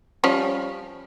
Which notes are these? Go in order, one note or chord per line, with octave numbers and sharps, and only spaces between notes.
F3 G3 C#4